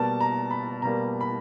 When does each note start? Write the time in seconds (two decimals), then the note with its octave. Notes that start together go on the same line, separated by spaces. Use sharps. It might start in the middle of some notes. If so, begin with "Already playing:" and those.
Already playing: B2 G3 A#3 A5
0.20 A#5
0.51 B5
0.82 B2 G3 A#3 A#5
1.21 B5